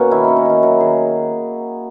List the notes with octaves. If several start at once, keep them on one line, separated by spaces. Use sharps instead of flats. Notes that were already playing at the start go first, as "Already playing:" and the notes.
Already playing: B2 A#3 C#4 F#4 C#5
D#3 E4
C#4 D#4
D#4
D#3 E4
F#3 F#4
D#3 G#4